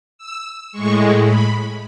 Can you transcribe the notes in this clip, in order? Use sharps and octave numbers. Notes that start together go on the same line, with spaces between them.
E6
A2 G#3 C#6
B5